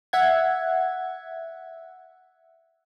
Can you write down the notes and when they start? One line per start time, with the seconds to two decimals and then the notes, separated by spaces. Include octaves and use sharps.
0.13 E5 F#5 G#6